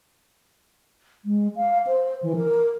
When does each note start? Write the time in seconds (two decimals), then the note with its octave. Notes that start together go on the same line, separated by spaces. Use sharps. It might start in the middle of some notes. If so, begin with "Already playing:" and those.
1.25 G#3
1.56 F5
1.87 C5
2.23 E3
2.36 A#4